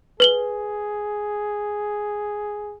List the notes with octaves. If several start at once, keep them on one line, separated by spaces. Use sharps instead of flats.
G#4 B4 F#7 G7